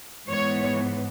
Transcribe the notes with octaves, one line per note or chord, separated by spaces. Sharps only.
G#2 E3 B3 C#5